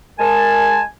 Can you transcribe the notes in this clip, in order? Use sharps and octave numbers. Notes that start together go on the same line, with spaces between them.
G#3 A#4 G#5 A5